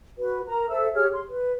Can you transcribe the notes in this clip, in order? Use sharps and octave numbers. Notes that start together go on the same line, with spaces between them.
F#4 B4
A#4 A#5
A4 C5 E5 E6
G4 G#4 C#5 F6
C6
B4